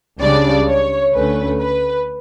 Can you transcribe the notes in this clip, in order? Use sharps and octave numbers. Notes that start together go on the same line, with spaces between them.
C#2 C#3 G3 D4 D5
C#5
D2 D3 A3 C#4 B4
B4